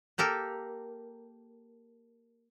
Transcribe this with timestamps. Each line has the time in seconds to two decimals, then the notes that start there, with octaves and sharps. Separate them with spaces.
0.18 A#3 G4 A4 A#4